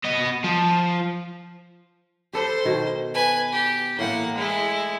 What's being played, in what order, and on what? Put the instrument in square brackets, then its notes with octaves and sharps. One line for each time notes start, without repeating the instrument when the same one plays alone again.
[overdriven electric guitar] B3 D#5
F3
[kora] G4 A4 B4 [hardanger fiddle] C5
[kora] B2 D#3
[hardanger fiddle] B4 G#5
G4
[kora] A2 E3 G5 [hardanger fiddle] A#3 F#5
[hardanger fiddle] G#3 E4